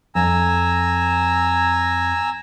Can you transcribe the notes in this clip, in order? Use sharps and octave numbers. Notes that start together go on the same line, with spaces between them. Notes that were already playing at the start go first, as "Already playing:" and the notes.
F2 G#5 A#5 E6